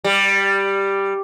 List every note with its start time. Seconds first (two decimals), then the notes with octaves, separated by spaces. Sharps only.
0.04 G3